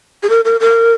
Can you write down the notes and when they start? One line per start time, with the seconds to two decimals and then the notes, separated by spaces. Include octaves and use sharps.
0.23 G#4
0.29 A#4
0.45 A#4
0.60 A#4